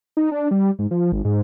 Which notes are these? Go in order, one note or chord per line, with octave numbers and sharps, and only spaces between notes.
D#4
D4
G3
G#2
F3
G#1
G#2